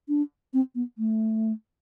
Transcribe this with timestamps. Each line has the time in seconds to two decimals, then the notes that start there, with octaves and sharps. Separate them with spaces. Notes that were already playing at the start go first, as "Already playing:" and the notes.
0.09 D4
0.54 C4
0.75 B3
0.98 A3